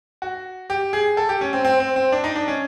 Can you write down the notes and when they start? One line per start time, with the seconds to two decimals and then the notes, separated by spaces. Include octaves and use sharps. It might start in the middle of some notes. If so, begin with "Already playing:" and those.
0.22 F#4
0.70 G4
0.93 G#4
1.17 A4
1.29 G4
1.41 C#4
1.53 C4
1.65 C4
1.80 C4
1.96 C4
2.12 D4
2.24 D#4
2.36 D4
2.48 C#4